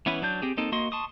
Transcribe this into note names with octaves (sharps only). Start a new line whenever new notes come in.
E3 B3 C#4 E4 B4
F#3 D4 G6
C4 G4 G#4
A#3 C4 D#4 A4
A#3 F#4 D#5 C6
A5 C6 C#6 D#6